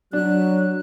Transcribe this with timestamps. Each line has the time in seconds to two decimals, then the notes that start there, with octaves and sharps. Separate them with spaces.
0.13 F#3 D4 F#6